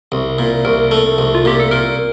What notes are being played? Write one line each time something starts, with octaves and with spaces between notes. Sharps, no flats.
C2
A#2
C2 A#4
A3
C2
F4
A#2 G4
A4
A#2 A#4